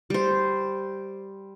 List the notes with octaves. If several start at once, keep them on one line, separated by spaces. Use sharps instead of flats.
G3 C5